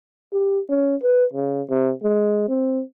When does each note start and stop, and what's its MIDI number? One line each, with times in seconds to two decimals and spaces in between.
0.33 0.60 67
0.69 0.96 61
1.03 1.25 71
1.34 1.62 49
1.70 1.92 48
2.03 2.44 56
2.49 2.83 60